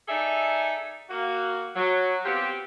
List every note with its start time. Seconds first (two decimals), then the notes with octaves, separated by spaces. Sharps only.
0.08 D#4 G#4 A4 D5 E5
1.10 A#3 F#4
1.76 F#3
2.25 B3 C4 F4 G4